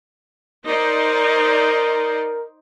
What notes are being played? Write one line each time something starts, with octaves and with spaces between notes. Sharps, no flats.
D#4 A#4 C5 D5